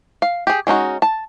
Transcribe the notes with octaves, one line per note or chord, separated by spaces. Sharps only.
F5
G4 G#4
G#3 C#4 D#4 F#4
A5